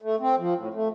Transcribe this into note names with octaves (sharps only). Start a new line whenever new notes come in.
A3
C4
F3
A2
A3